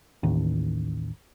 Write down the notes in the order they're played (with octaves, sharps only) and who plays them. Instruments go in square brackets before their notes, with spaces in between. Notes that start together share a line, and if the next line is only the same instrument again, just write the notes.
[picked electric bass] A1 D#2